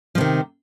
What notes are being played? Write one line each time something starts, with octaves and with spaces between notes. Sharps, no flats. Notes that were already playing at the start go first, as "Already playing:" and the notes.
C3 D#3 F3